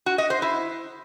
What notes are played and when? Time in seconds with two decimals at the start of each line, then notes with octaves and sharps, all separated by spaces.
0.06 F#4
0.18 D#5
0.30 C5
0.42 E4